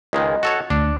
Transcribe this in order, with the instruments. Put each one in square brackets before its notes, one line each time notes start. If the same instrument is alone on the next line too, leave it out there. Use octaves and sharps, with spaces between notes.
[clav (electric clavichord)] C#2 D#3 G#3 [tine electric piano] D#5
[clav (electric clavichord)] F#4 A4 C#5
[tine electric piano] D2 [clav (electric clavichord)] D4